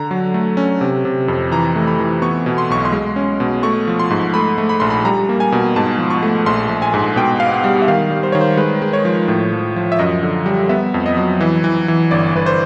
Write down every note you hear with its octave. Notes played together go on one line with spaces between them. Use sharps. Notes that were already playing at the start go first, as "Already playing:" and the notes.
Already playing: D3 A#5
F#3
A3
C#4
C3
C3
F2
E3 A#5
A3
B5
E3
B3 C#6
B2
C6
B1 C#6
C6
G#3
C#4
B2
A3 C#6
F3
C6
G#2
A3 B5
A3
B5
A#1 C6
B5
G3 A#5
A#3
G#5
B2
G#2 A5
F3
C#6
A3
A#1 C6
A#1
G#5
G#2
B2 G5
B3 F5
F#5
G3
E5
D#3 F5
G3
C5
D#3 C#5
C5
G#3 B4
G#3
C#5
F3
A2
F3
F3
E5
F#2 D#5
D3
G3
B3 E5
F2
D#5
F#3
E3
E3
E3
G1 D5
G1 B4
C5